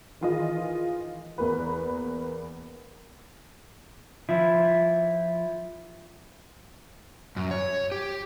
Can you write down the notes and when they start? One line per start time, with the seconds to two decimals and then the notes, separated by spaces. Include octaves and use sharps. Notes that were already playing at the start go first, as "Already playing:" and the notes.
0.21 D#3 E3 F4 G#4 D#5
1.38 E2 A#3 A#4 B4
4.29 F3 E4
7.36 F#2
7.51 C#5
7.92 G4